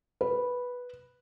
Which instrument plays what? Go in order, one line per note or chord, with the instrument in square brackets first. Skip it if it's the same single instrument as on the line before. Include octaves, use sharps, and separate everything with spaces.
[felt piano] B4